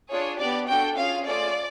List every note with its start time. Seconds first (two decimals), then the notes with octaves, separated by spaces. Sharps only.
0.10 D4 F4 G#4 C#5
0.39 B3 D4 G4 D5
0.67 D4 F#4 A4 G5
0.96 C#4 F4 G#4 F5
1.25 A3 C#4 F4 G#4 D5